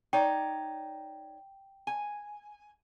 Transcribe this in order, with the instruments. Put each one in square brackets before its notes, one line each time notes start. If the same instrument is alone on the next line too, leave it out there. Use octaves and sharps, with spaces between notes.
[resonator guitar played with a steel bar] D#4 C#5 D5 [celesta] G5
[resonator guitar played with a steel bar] G#5